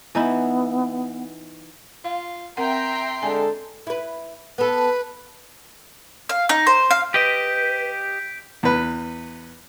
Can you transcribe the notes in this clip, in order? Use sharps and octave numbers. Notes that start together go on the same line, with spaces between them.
E3 B3 D#4 E4
F4 F5
C4 A#4 E5 F#5 G5 A#5 C6
D3 G#3 A4 G#5
E4 B4
B3 A4 B4
F5
D#4
C5
F5
G4 B4 D#5 G6 B6 D7
E2 B4